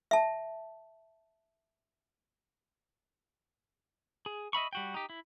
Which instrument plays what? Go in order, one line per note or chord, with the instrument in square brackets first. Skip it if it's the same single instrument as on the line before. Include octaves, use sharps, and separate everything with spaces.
[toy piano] E5 A5
[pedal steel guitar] G#4
D#5 E5 B5 C#6
G3 F#4 G5
D#4 G4
E4